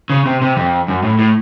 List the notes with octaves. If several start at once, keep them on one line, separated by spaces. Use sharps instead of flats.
C#3
C3
C3
F2
F#2
A2
A2